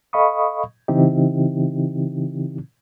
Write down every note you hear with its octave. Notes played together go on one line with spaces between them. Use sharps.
A4 D#5 F5 B5 C#6 D#6
C#3 E3 C4 D#4 E4 G4